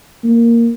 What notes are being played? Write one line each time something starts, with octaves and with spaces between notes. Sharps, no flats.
A#3